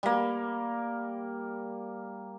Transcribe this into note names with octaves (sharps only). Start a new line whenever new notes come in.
G3 A#3